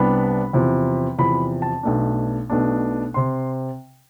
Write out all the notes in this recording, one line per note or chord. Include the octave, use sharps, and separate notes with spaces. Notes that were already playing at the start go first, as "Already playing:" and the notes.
Already playing: C2 C3 G3 B3 D4 B5
E2 C3 F3
E2 C3 F3 B5
A5
B1 B2 A3 D4
B1 B2 A3 D4
C3 C6